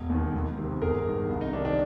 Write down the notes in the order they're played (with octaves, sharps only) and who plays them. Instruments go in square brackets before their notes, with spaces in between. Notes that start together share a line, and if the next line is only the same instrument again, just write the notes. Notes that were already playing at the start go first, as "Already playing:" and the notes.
Already playing: [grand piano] E1
D#2 D#3
C#2
C3 D#3
G1 G#4 A#4
G2 D#3
C2
D#4
C3 D#3 D4
D4